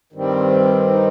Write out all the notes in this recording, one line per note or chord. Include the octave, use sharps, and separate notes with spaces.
G2 D#3 G3 C4
D#4